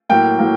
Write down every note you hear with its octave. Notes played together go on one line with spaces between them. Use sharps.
A2 F#3 A#3 G5
A2 F#3 A#3